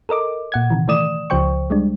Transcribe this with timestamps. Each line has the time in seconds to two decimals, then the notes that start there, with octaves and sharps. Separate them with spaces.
0.09 A4 A#4 D#5 D6
0.52 A#2 F#5 G#6
0.70 C3 D#3 E3
0.88 D#3 E3 A3 D5 D#6 E7
1.30 C#2 C#3 F3 C5 G5 C#6
1.70 G3 G#3 D4